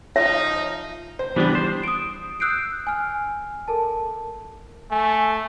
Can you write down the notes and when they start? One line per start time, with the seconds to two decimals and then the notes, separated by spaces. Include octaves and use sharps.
0.16 F3 D#4 E5
1.19 C5
1.36 E3 G3 B3 D4 G4
1.55 C5
1.83 D#6 D7
2.40 D#6 E6 F#6 G6 C7 D7
2.87 G#5 F6
3.68 A4 A#4 A5
4.91 A3 G#5